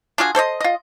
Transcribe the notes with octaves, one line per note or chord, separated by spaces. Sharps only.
D4 F4 F#4 G#4
A4 C5 C#5 D#5
F4 D#5